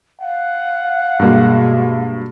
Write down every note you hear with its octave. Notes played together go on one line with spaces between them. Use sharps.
F5 F#5
G2 B2 G#3 A#3 F#4